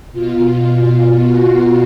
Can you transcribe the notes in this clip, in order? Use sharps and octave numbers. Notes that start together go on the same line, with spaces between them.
B2 F4
F#4